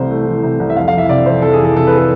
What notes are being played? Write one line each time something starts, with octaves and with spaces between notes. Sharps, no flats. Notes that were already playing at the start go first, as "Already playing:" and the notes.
Already playing: C2 C3 E3 A3 C5
A3
E3
C3
C2
E5
F2 F5
F5
E3 E5
C3 D5
F2 C5
F2 A4
G#4
E3 A4
C3 A4
B4
A4